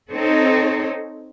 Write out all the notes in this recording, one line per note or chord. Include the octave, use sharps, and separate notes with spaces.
C4 D#4 A4 C#5